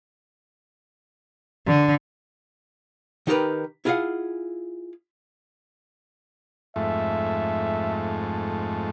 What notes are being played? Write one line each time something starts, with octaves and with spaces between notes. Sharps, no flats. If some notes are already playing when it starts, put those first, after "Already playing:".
D3
D#3 D#4 G4 A#4 B4
E4 F4 G#4 D#5 F5 F#5
F2 G#2 A3 E5